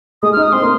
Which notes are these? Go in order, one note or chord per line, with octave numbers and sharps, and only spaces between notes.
G#3 D#6
F6
D#4
D#6
C4 C6
A#3